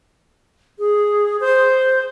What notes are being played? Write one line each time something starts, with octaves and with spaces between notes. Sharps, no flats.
G#4
C5